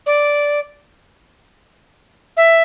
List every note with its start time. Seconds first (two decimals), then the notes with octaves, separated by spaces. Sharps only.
0.06 D5
2.37 E5